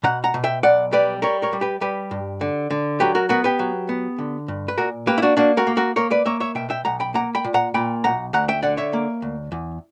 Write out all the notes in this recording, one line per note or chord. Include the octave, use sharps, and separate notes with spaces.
B2 F#5 A#5
F#5 A#5
B2
E5 G5
B1 D5 F#5
G3 B4 D5
G3 A#4 C#5
A#4 C#5
G3
G4 B4
G3 G4 B4
G2
D3
D3
F#3 G4 B4
F#4 A#4
B3 F#4 A#4
G4 B4
F#3
B3
D3
G2
B4
A#2 F#4 A#4
A#3 G4 B4
E4
D4 F#4
A#3 D4 F#4
F#4 A#4
A#3
F#4 A#4
A#3 A#4 C#5
B4 D5
A#3 C#5 E5
C#5 E5
B2 E5 G5
E5 G5
B1 F#5 A#5
G5 B5
A#3 F#5 A#5
G5 B5
A#2
F#5 A#5
A#2 G5 B5
B1 F#5 A#5
D2 F#5 A#5
E5 G5
D3 D5 F#5
C#5 E5
A#3
D2
E2